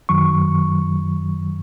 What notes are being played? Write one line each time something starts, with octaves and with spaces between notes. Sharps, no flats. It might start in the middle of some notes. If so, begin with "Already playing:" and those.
F#2 D#3 F#3 C#6